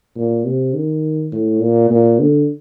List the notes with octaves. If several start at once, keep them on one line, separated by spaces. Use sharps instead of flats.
A#2
C3
D#3
A2
A#2
A#2
D3